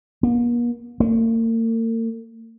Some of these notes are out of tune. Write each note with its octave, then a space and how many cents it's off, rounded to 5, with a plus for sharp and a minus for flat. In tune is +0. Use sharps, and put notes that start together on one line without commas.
A#3 +45
A#3 -45